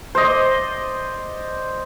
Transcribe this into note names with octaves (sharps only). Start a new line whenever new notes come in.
C5 D5 D#5